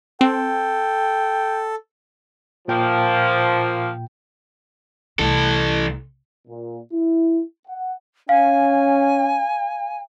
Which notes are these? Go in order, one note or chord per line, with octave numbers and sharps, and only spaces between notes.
C4 A4 G5
A#2 F3 A#3 G5
C2 E3 A3 A4
A#2
E4
F#5
C#4 F5 G#5